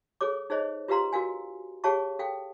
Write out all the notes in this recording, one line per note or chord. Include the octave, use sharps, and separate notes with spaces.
G#4 A4 C#5 D6
D#4 G#4 C5 C#5 D#5
F4 G4 B4 F5 A#5 C6
F#4 A#4 F5 G#5
G4 G#4 C#5 F5 A5 C#6
A4 F5 G5